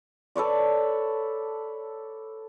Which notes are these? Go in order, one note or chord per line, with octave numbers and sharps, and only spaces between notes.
A4 B4 C#5 D5